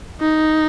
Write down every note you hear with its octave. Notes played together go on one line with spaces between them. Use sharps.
D#4